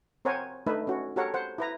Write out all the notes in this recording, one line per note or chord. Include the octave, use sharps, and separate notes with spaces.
C4 A#4 C5 C#5 F#5 G#5
A3 D4 D#4 B4 E5
C#4 F#4
F#4 G4 A4 A#4 C#5 F#5
C5 F#5
E4 B4 A#5